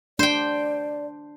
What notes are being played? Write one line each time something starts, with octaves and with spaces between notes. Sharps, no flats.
D4 C5 D5 G5